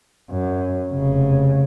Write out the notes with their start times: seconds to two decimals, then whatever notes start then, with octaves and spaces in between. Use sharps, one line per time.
0.31 F#2
0.91 F1 C#3